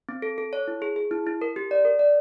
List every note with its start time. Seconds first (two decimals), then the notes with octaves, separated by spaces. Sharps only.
0.09 C4
0.22 A4
0.38 A4
0.53 C#5
0.68 E4
0.82 G#4
0.96 G#4
1.11 E4
1.26 E4
1.42 A#4
1.56 G4
1.71 D5
1.85 A#4
1.99 D5